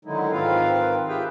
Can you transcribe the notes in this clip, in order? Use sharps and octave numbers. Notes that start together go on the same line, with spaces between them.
D3 D#3 F#3 G#3 D#4 E4
G#2 D#3 C4 F4 B4 F5
F4 G4 G#4 B4 E5 G5